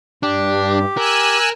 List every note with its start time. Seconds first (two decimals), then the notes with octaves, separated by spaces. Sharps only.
0.23 G2 D4 G4
0.97 A#4 G#5 E6 F#6